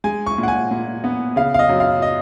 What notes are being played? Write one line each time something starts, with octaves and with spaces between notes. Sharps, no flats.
G#3 G#5
C#6
A#2
F#5
G#5
A#2
B3
C#3 F5
F5
D#5
F#2
F5
D#5